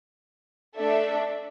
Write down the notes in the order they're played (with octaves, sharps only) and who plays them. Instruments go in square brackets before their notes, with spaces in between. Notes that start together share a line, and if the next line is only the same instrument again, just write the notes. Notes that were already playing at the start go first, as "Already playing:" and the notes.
[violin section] A3 D4 A4 E5